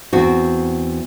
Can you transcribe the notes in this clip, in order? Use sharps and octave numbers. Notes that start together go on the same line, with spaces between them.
E2 C4 F#4